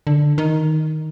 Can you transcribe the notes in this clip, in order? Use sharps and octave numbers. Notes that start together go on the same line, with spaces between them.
D3
D#3